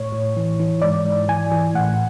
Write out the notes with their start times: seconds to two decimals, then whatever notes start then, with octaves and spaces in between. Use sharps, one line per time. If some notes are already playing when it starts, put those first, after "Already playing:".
Already playing: A2 C#5
0.12 A2
0.37 E3
0.60 E3
0.82 G#2 D5
1.05 G#2
1.28 E3 G#5
1.52 E3
1.74 A2 F#5